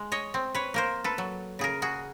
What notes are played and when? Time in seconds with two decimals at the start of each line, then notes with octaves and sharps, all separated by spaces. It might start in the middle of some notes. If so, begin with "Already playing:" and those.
Already playing: G#3
0.12 C#5 D#5
0.34 C4
0.55 B4 C#5
0.74 A#3 A#4 C5
1.04 A4 B4
1.18 F#3
1.59 C#3 G#4 A#4
1.82 F#4 G#4